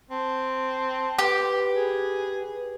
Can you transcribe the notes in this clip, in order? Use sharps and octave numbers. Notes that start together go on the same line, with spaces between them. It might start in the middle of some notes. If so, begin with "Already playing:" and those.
C4 A5
G4 B4
G#4